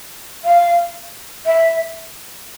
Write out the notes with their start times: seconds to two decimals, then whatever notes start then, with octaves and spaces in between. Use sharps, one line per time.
0.45 F5
1.46 E5